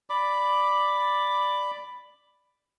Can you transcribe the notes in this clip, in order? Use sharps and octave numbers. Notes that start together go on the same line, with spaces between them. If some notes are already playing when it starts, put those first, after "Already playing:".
D5 B5 D6